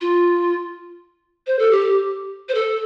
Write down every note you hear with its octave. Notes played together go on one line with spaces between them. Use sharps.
F4
C5
A4
G4
C5
A4